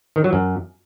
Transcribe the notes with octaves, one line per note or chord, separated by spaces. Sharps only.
D#3
F#3
F#2